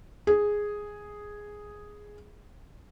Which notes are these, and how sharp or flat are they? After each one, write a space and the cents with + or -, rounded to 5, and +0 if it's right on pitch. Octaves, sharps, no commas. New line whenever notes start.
G#4 +0